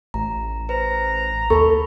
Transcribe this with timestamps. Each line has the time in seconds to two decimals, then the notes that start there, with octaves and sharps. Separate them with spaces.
0.14 A1 A#5
0.69 B4 C5 A#5
1.50 D#2 A4 B5 C#6